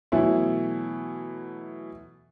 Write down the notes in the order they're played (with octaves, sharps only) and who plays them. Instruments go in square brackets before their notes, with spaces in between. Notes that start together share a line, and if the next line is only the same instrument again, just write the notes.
[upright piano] B2 E3 F#3 A3 E4